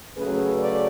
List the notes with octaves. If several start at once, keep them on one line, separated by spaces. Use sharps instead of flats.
C#3 F#3 A3 C#4 G#4 B4
B4 D5